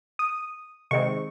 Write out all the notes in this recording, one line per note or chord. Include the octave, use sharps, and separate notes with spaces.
D#6
C3 D#3 G#3 C4 D#4 C#6